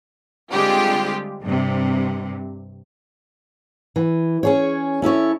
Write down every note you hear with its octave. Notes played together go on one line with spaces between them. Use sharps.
D3 G3 G#3 C4 F4 G4
G2 C3
E3
C#4 G#4 C#5
C#4 E4 A4 C#5